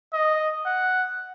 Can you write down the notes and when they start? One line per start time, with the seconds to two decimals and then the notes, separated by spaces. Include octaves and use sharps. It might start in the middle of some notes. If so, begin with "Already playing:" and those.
0.13 D#5
0.66 F#5